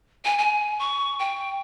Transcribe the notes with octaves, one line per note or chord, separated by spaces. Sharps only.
G#5
G#5
C#6
G5